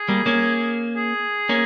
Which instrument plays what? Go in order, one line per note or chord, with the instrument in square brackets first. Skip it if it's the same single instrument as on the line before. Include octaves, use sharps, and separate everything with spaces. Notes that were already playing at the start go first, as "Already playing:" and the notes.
Already playing: [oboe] G#4
[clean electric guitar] G3 A#3
A#3 C#4
[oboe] G#4
[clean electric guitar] A#3 C#4